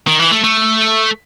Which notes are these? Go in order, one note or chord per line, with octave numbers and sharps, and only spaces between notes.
D#3
E3
A3
A3